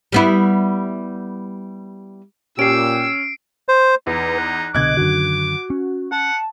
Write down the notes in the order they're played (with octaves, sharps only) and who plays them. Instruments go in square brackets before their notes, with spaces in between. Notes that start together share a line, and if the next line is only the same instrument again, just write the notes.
[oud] G3 B3 E4
[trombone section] A#2 G4 [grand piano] C#4 [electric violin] E6 [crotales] C7 D7
[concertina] C5
[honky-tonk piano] E2 [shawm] D#4 [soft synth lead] B4
[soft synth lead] F#6
[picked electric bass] C2 B2 D3 [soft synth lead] D#5 [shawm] D6 [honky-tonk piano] F#6 G#6
[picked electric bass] F#2 D3 D#3 [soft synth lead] F#4
[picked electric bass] C#4
[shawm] F#5 [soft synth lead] A5